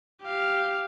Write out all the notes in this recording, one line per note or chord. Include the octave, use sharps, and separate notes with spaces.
G4 F5